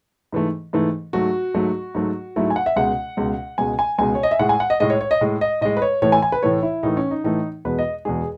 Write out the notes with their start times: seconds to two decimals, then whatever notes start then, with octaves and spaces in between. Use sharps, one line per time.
0.32 G#2 E3 A3
0.73 G#2 E3 A3
1.13 G#2 F#3 A3 F#4
1.54 G#2 F#3 A3
1.95 G#2 F#3 A3
2.36 G#2 F#3 A3 E4
2.50 G#5
2.56 F#5
2.66 E5
2.76 C#2 B2 G#3 F#5
3.17 C#2 B2 G#3
3.58 C#2 B2 G#3 G#5
3.79 G#5
3.98 C#2 B2 G#3 G#5
4.15 C#5
4.23 D#5
4.31 E5
4.39 A2 G#3 F#5
4.49 G#5
4.60 F#5
4.70 D#5
4.80 A2 G#3 D#5
4.90 C#5
5.01 C#5
5.11 D#5
5.21 A2 G#3
5.41 D#5
5.61 A2 G#3 D#5
5.77 B4
5.82 C#5
6.02 A2 E3 A3 C#5
6.12 G#5
6.22 G#5
6.32 B4
6.42 A2 E3 A3 C#5
6.63 E4
6.83 A2 E3 A3 D#4
6.97 C#4
7.11 D#4
7.24 A2 E3 A3 D#4
7.65 E2 B2 G#3 B4
7.79 D#5
8.05 E2 B2 G#3 G#4